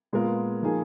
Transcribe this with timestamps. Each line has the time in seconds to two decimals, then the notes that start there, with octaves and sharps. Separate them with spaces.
0.13 A#2 G#3 B3 F4 A#4
0.63 F3 A#3 D#4 G#4